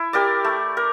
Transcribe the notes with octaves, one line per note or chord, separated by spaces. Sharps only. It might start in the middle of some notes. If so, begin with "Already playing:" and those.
Already playing: E4
G4 A#4 D5
A3
A#4